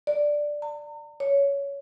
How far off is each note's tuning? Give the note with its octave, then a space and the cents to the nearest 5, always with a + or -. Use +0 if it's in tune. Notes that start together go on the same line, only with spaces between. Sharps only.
D5 +5
A#5 -40
C#5 +15